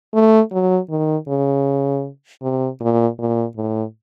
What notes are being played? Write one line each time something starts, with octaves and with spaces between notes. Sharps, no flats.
A3
F#3
D#3
C#3
C3
A#2
A#2
A2